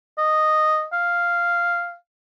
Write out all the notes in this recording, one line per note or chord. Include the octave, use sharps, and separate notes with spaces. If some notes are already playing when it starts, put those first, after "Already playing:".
D#5
F5